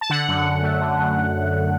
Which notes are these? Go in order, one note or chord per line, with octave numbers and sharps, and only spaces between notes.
A5
D3 F#5
F#2
F#2
A3
D3
F#2